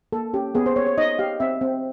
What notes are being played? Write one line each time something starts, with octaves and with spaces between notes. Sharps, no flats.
A#3 A4
C#4 G4
B3 G#4
C5
B3 C#5
C#5
D#4 D#5
G4 F5
C4 E5
C4